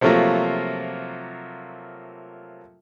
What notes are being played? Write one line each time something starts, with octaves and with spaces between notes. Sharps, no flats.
C3 F3 F#3 A3 A#3 F4